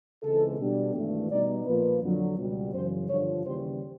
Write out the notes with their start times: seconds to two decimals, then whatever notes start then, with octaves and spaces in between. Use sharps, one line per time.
0.23 C#2 C#3 E3 G#3 C4 A4
0.59 B2 G3 B3 D4
0.95 G#1 G2 E3 A3
1.31 B2 G3 B3 D#4 D5
1.66 A#2 F3 A#3 B4
2.02 F2 D3 F#3
2.38 C#2 B2 G3
2.74 F#2 C#3 E3 C5
3.10 G2 D3 F3 C#5
3.45 D#2 C#3 E3 G3 C5